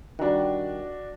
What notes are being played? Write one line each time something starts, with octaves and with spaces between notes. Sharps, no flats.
D#3 G3 D4 F#4